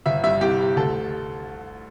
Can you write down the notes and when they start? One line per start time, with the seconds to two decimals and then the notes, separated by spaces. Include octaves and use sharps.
0.06 G1 E5
0.24 G2 E5
0.41 C2 G4
0.59 C3
0.77 D2 A4